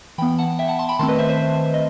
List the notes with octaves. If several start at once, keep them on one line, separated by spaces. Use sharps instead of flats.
E3 B3 G5 B5
F#5 A5
E5 G5
F#5 A5
A5 C6
G5 B5
D#3 A3 C4 A5 C6
B4 D#5
C5 E5
C5 E5
D#5